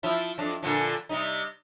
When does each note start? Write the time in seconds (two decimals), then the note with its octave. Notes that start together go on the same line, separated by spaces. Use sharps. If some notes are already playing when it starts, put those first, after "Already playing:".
0.03 F3 E4
0.38 F2 D4
0.63 A#2 D3 F3
1.09 C3 G3 D#4